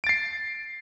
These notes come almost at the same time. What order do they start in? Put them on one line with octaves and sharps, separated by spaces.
D7 A6 C7